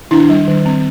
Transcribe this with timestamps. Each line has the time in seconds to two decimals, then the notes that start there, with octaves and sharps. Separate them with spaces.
0.11 D#3 D4 E4
0.30 G3
0.48 D#3
0.66 C4